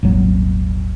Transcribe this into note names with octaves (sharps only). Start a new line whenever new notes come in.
D#1 G#1 F#3